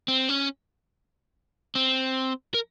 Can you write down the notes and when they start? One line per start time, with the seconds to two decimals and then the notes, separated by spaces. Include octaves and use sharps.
0.08 C4
0.29 C#4
1.75 C4
2.54 A#4